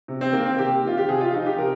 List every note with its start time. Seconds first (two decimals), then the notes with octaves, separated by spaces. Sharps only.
0.08 C3
0.21 C4
0.33 D#3 A#3
0.46 C4
0.58 C3 G4
0.83 D#3 F4
0.98 G4
1.08 C3 G#4
1.21 F4
1.34 F3 D#4
1.46 G4
1.58 C3 A#4